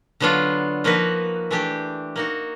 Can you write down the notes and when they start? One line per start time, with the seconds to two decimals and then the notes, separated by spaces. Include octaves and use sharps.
0.20 D3 F#3 B3 D4 F4
0.84 F3 A#3 D#4 F#4 B4
1.51 E3 A3 D4 G4
2.16 A#3 D#4 F#4